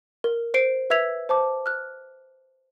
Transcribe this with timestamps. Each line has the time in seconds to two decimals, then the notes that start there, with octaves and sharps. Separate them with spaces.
0.24 A#4
0.54 C5 C7 D7
0.90 B4 E5 E6 G#6 B6 F7
1.29 C5 A5 D6
1.66 F6 F#6